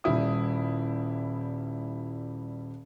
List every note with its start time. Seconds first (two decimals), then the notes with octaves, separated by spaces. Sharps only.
0.04 D#1 G3 E4 D#6